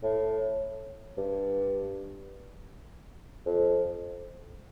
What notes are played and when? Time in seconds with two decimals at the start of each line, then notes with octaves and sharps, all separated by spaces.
0.03 A2
1.17 G2
3.46 F2